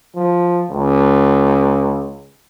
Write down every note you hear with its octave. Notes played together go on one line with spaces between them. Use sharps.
F3
C#2